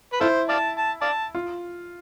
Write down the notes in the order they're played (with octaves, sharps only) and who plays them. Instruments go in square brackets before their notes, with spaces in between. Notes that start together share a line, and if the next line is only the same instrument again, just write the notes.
[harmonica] B4
[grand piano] E4 [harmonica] F4 A4 C5
[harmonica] D5 F5 A5
A5
D5 F5 A5
[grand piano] F4